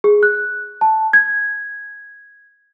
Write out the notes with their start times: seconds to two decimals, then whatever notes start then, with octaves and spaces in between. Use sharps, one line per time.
0.04 G#4
0.23 F#6
0.81 A5
1.13 G#6